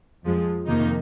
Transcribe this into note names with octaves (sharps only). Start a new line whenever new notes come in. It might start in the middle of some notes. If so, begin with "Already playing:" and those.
F2 F3 G#3
F2 C3 D#3 A#3 D#4